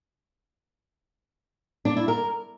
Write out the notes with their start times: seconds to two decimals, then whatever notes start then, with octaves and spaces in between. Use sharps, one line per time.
1.85 D4
1.97 E4
2.08 A#4